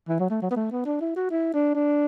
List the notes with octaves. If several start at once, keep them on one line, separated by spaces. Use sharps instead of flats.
E3
F#3
A3
F#3
B3
A3
B3
D4
E4
F#4
E4
D4
D4